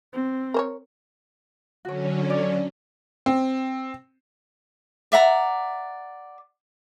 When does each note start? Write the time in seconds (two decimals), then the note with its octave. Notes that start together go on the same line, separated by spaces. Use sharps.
0.13 C4
0.54 A#4 C5 C#5
1.85 D3 F#3 C#4 F#4 C#5
2.30 D5
3.26 C4
5.12 D5 E5 F#5 A#5